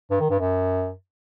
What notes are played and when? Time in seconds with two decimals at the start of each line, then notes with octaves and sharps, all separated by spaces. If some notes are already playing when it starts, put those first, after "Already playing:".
0.10 G2
0.20 D#3
0.30 G2
0.40 F#2